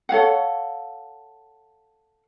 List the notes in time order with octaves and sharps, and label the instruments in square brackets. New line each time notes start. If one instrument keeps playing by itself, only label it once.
[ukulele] A4 C#5 F5 F#5